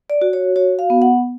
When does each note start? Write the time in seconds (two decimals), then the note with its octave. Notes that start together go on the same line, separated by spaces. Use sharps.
0.10 D5
0.22 F#4
0.33 C#5
0.56 F#4 C#5
0.79 F5
0.90 B3
1.02 F#5